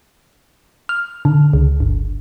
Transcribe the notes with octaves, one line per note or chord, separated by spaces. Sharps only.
F6
D3
C#2
G1